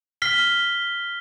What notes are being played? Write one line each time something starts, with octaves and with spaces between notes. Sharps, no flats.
F6 B6 C7 G7